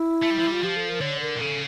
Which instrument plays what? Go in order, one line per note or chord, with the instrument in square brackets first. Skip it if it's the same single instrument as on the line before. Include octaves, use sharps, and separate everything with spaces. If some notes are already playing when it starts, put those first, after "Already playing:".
Already playing: [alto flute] E4
[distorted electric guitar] A3
G3
F3
G3
[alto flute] F4
[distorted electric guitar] F3 [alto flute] G4
[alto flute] A4
A#4
[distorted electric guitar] D3 [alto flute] C#5
[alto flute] A#4
[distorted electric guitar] A#2
[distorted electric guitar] C#3 [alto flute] A4